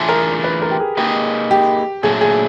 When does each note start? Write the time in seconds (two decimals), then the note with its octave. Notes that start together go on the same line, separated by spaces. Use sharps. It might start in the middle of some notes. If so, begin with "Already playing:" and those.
Already playing: E3 A3 D4 F4 G#4
0.09 A#4
0.44 B4
0.62 A#4
0.71 G4
0.80 G#4
0.97 A#3 D#4 G4 G#4 B4 D#5
1.51 G4
2.03 A#2 F#3 A3 D4 G#4
2.21 G#4